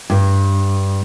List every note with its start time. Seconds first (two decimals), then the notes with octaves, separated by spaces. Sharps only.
0.10 G2